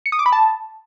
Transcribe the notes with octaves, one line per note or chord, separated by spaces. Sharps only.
C#7
D#6
D6
B5
A5